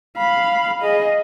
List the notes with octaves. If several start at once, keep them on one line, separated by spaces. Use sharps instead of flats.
F5 B5
G#4 D#5